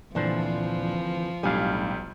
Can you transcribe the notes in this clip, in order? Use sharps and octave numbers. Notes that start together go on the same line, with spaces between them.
D2 A#2 E3 F3 C4 D4 C5
B1 A2 G3 D4 F5 G#5